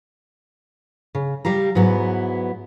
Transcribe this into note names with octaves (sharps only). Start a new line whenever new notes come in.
C#3
G3 G4 F5 A#5
G#2 F#3 B3 E4